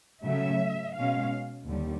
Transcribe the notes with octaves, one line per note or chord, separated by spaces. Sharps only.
C#3 F#3 A3 C#4 E5
B2 G#3 C#4 F5
D#2 D3 G3